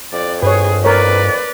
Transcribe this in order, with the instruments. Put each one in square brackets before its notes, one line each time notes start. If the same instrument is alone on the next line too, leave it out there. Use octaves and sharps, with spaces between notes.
[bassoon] F2 [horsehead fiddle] D5
[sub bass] G2 [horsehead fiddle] G#4 [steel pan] B4 C#5
[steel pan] A#4 C#5 [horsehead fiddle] B4 D5